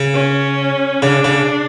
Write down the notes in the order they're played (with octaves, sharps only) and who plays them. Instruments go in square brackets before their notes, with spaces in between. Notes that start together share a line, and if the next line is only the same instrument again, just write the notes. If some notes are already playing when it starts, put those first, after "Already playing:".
Already playing: [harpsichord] C#3
[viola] C#4
[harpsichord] C#3 [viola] D4
[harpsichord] C#3